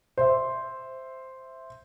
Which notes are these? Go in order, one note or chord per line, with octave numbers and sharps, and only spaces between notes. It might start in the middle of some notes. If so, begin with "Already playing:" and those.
C5 E5